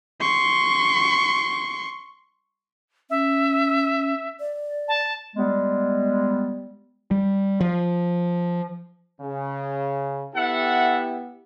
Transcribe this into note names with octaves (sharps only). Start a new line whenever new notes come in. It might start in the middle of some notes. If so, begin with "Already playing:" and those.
C6 C#6
C#4 E5
D5
A5
G3 G#3 B3
G3
F3
C#3
B3 E4 G4 A4 E5 F#5